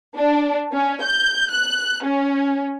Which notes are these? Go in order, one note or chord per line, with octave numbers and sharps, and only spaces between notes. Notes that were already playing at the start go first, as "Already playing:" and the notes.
D4
C#4
G6
F#6
C#4